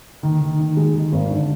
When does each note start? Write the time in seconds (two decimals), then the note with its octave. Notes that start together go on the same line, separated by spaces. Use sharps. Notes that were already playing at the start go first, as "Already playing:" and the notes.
0.23 D#3
0.41 D#3
0.60 D#3
0.77 G#3
0.95 D#3
1.12 G#1
1.31 D3